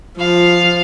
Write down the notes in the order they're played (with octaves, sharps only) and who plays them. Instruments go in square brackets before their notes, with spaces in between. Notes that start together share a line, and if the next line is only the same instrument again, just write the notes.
[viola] F3 [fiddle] F5